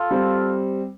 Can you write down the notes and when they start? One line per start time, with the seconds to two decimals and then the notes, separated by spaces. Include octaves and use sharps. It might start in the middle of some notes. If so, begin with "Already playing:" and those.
Already playing: F4 A4 F5
0.11 G3 C4